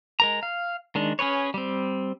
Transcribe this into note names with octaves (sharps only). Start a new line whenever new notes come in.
G#3 A#4 A#5
F5
D#3 G#3 D4
C#4 G#4 B4 C#5
G3 C4